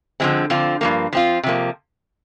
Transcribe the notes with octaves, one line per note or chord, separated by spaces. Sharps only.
D3 F3 G#3 C4
D3 F3 C4 F4
G2 F3 A#3
F3 C4 F4
C3 F3 A#3